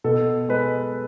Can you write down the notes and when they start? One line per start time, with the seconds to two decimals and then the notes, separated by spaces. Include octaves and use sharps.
0.04 B2 A4
0.49 G#3 B4